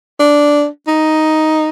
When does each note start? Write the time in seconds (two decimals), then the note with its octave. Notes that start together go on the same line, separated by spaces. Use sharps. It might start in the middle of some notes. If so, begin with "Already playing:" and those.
0.20 D4
0.88 D#4